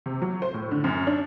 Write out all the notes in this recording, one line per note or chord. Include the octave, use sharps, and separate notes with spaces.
C3
F#3
C5
A2
D3
F#2
D4